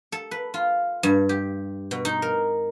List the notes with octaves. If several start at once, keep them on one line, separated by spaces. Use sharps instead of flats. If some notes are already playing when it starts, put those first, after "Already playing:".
A4
B4
F4
G2
G4
B2
D#4
A#4